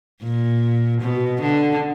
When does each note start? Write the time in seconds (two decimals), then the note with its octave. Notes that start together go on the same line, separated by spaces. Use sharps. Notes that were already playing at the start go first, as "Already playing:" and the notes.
0.23 A#2
1.01 B2
1.42 D3